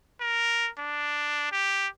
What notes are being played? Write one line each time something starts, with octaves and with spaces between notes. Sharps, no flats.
A#4
D4
G4